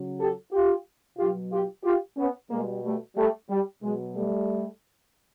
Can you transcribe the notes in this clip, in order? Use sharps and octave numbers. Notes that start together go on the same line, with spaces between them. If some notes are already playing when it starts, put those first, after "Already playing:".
Already playing: C#3 F#3
G4 A4
F4 G4
B2 F#3 F4 G4
F4 G4
F4 G4
B3 C#4
B2 G3 G#3 A#3
G3 A3
G3 A3
G3
B2 F#3 G#3
G3 A3